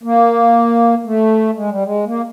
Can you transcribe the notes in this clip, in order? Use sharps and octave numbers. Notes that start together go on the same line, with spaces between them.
A#3
A3
G#3
G3
G#3
A#3